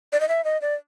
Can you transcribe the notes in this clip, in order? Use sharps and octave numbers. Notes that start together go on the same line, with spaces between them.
D5
D#5
E5
D#5
D5